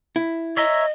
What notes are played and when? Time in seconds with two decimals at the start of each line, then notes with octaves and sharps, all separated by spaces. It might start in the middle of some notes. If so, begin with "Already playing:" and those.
0.16 E4
0.57 C#5 D#5 E5 A#5